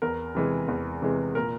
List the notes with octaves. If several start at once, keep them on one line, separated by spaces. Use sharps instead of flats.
E2 A#4
C3 E3 G#3
E2
C3 E3 G#3
A#2 A#4